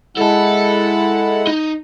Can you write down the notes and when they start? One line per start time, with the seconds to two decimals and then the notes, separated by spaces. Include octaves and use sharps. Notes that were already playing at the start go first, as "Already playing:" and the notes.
0.17 G#3 E4 A4 F#5 A5
1.47 D#4